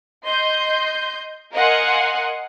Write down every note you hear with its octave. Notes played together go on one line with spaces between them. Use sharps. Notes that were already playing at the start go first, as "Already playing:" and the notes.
D#5 C6 G6
A#4 D#5 F5 F#5 G#5 C6